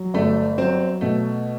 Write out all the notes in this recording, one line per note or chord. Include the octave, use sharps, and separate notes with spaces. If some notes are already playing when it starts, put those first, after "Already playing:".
Already playing: F#3
G1 A3
F#3 C4
B2 A3